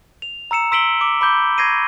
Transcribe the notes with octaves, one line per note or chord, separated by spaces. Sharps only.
F7
A#5 E6 C#7 E7
C6 E6 B6 D7 F#7 G7
D6 E7
B5 D6 G6 G7
C#6 G#6 A#6 C7 D#7